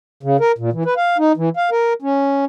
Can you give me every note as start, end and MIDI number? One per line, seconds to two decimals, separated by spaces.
0.23 0.37 49
0.40 0.52 70
0.58 0.70 46
0.73 0.84 52
0.85 0.94 71
0.97 1.17 77
1.18 1.32 63
1.37 1.49 52
1.57 1.70 77
1.71 1.93 70
2.02 2.45 61